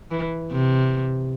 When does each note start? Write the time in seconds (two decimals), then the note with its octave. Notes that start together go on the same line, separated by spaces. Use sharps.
0.11 E3
0.52 C3